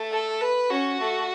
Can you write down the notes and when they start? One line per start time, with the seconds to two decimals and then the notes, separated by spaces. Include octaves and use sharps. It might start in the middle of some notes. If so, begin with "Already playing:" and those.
Already playing: A3
0.12 A4
0.41 B4
0.70 C#4 F#4
1.00 A3